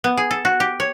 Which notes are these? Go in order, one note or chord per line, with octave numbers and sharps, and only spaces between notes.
B3
G#4
A4
F#4
G4
C#5